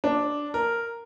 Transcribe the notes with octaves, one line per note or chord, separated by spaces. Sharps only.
D4
A#4